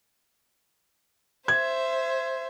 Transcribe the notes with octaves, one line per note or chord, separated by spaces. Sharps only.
C5 E5 G#6